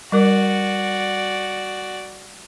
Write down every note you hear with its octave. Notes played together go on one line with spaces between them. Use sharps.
G3 F#4 A#4 D5 D6